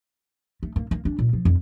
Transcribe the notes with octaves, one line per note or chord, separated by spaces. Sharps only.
A3
A#3
A#3
D4
A#2
F3
F2